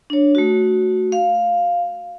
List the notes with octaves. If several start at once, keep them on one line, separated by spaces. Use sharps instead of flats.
D4 C#5
A3 F#4
F5